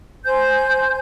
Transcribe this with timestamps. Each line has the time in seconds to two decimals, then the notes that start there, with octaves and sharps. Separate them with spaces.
0.25 C5 G#5 G6